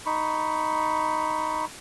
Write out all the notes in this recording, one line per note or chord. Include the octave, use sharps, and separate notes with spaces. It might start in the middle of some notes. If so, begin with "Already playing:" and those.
D#4 B5 C#6